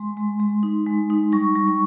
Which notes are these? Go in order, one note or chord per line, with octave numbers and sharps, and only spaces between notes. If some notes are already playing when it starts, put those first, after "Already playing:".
Already playing: G#3 C6
G#3
G#3
D#4
G#3
D#4
G3 C#6
G3
C#6